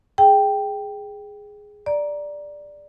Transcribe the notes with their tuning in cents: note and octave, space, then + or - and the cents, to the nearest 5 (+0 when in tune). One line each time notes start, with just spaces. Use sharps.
G#4 +0 G5 +0
D5 +0 A#5 +10